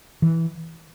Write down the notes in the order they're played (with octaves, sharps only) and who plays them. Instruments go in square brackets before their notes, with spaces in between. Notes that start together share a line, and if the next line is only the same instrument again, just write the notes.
[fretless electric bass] E3